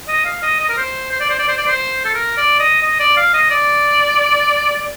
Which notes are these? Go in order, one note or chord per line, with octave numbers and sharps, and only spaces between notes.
D#5
F5
D#5
D#5
A#4
C5
C5
D5
C5
D5
C5
D5
C5
A4
A#4
D5
D#5
D#5
D5
F5
D#5
D5